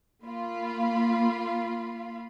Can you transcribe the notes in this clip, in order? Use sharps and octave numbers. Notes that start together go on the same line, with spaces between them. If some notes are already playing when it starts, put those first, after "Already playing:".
A#3 F4 B5